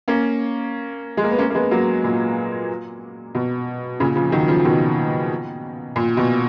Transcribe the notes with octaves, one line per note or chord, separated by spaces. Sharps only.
A#3 C#4
G#3
A#3
B3
A#3 C#4
A#3
G#3 B3
F#3 A#3
A#2
B2
A#2 C#3
C#3 F3
D#3 F#3
C#3 F3
F3
B2 D#3
A#2
B2